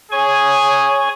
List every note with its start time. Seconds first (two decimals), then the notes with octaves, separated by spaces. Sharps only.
0.12 G#4 C#5 G#5 C#6